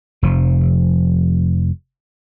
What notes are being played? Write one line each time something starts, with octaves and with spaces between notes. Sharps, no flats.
F1 F3